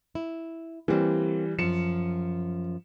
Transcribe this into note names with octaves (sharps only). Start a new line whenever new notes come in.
E4
E3 G3 A#3 C4
F#2 F3 C#7 E7